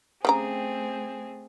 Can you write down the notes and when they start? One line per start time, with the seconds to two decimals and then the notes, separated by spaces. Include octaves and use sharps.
0.25 C#3 A3 C4 G4 G#4 A#5